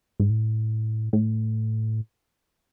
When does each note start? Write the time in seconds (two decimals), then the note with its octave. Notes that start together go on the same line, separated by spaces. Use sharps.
0.20 G#2
0.30 A2
1.13 A2